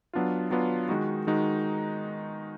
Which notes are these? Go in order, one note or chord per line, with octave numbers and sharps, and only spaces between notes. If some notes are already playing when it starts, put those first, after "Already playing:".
F#3 B3 D4 F4
F#3 B3 D4 F4
D#3 G#3 D#4 F#4
D#3 G#3 D#4 F#4